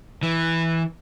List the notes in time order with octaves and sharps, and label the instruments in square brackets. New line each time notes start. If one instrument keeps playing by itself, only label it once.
[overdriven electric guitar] E3